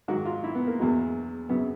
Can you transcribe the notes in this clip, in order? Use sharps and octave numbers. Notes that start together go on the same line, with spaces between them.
G#2 D#3 F#3 F#4
F4
E4
B3
A#3
E2 B2 F#3 G#3
F#2 C#3 F#3 B3